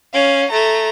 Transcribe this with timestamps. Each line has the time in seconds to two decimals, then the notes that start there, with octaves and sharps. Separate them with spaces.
0.14 C#4 F5
0.50 A3 A#5